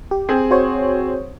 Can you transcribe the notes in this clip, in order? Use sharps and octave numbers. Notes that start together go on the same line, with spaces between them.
G4
C4 G#4
F#4 C5 C#5